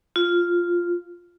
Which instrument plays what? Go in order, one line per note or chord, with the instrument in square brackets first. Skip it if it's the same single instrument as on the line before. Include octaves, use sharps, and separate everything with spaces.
[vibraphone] F4